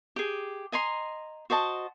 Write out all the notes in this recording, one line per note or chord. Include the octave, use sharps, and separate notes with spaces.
G4 G#4
D#5 G#5 A#5 C6
F#4 C5 D#5 A5